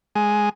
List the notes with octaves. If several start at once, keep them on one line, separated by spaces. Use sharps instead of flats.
G#3